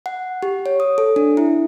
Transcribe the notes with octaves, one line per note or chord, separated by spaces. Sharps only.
F#5
G4
C#5
D#6
A4
D4
E4